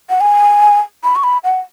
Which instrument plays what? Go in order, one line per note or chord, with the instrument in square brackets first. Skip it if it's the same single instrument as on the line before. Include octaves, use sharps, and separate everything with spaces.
[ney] F#5
G#5
B5
C#6
B5
F#5